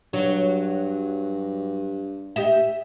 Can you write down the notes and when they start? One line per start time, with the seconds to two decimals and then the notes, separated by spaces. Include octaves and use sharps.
0.13 G2 F#3
2.36 G4 D#5 E5